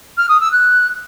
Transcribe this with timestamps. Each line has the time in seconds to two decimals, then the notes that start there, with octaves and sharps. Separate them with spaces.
0.17 F6
0.28 D#6
0.40 E6
0.52 F#6